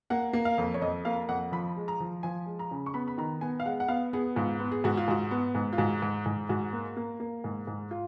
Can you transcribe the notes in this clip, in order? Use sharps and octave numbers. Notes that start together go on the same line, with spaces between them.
A#3 F#5
A#3
F5
F2
C#5
F2 D#5
A#3 F5
F2 F#5
F3 B5
G#3
A#5
F3
F3 G#5
G#3
A#5
C#3
C#6
B3 B5
B5
D#3 A#5
B3 G#5
F5
G#3 F#5
F#5
B3 F5
B3 G#4
G#2 F4
B3
G#4
G#2 F#4
F4
G#2 F#4
B3
G#2
F4
G#2 F#4
G#2
G#2
G#2 F#4
A#3
A#3
A#3
G#2
G#2
F4